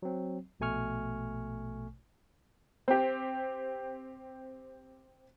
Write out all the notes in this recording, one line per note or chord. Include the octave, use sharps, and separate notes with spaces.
F#3 C4
A#1 B2 A3 G#5 C#6 F6
C4 G4